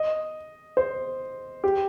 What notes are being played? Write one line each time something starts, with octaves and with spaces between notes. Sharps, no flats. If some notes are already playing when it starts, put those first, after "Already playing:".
Already playing: D#5
C5
G4